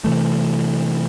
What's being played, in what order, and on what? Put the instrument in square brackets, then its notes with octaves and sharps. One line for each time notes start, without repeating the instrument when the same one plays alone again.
[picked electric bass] C3 E3 A3